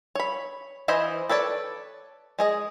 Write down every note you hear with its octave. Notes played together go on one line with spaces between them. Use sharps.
C#5 B5
E3 C5 D#5 G#5 B5
A4 B4 C#5 D5
G#3 G#4 D#5